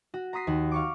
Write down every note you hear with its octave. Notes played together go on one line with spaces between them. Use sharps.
F#4
A#5 C6 D#6 B6 C7
D#2 F#5
F5 C#6 D6